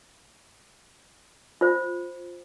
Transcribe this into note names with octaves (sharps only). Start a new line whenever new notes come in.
F4 C5